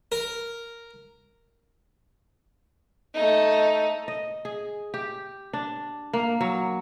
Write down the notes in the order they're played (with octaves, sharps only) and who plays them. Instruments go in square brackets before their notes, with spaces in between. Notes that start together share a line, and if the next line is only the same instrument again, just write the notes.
[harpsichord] A#4
[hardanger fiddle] A3 D#4
[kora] D#5
G#4
G4
D4
A#3
F#3